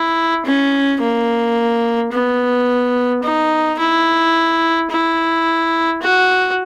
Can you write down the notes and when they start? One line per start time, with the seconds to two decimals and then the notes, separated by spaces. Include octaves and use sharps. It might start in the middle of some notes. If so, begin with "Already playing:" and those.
Already playing: E4
0.46 C#4
1.01 A#3
2.12 B3
3.23 D#4
3.79 E4
4.91 E4
6.02 F#4